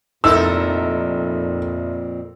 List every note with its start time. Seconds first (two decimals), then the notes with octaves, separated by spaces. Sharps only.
0.24 F1 F2 A#2 D#4 E4 A4 A#4 E6